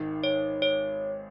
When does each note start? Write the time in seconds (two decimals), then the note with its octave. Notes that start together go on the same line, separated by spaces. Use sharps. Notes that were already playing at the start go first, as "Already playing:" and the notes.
Already playing: G#1 G#2 D#3
0.24 C#5
0.62 C#5